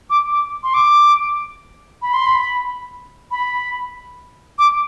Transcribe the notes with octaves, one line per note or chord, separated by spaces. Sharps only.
D6
D6
C6
D6
B5
C6
B5
B5
D6